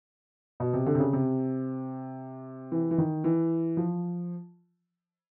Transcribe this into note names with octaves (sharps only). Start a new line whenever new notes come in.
B2
C3
D3
C3
C#3
C3
E3
E3
D#3
E3
F3